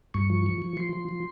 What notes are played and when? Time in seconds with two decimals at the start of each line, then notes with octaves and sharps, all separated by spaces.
0.14 G2 C#6
0.30 F3
0.46 F3
0.62 F3
0.77 F3 C6
0.93 F3
1.09 F3